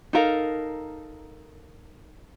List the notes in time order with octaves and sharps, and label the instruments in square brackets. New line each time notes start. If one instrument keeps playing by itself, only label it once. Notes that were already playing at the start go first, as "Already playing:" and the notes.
[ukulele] D#4 A4 A#4 F5